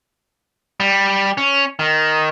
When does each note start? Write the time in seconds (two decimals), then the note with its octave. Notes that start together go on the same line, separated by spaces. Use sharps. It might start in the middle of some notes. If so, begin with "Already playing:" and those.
0.80 G3
1.37 C#4
1.79 D#3